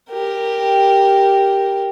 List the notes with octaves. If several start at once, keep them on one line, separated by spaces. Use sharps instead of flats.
G4 A#4